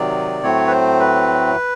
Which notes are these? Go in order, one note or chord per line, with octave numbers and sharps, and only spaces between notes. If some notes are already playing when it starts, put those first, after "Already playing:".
Already playing: C3 D#3 F#3 D5
A2 F#3 A3 C4 C#5
B4
C5
B4